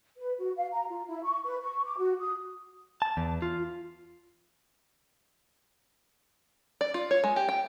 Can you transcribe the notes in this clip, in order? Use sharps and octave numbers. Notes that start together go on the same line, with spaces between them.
B4
F#4
F5
A#5
F4
E4
C#6
B4
C#6
D6
F#4
D#6
A5
E2
F4
D5
F4
C#5
G#3
G4
G5